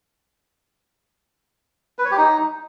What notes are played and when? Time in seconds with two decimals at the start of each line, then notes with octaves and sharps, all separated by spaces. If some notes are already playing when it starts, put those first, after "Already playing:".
1.99 B4
2.05 C#5
2.11 G4
2.17 D#4